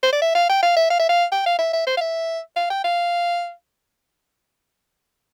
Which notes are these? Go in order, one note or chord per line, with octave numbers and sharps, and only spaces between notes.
C5
D5
E5
F5
G5
F5
E5
F5
E5
F5
G5
F5
E5
E5
C5
F5
E5
F5
G5
F5